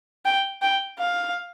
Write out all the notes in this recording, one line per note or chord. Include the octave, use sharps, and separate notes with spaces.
G5
G5
F5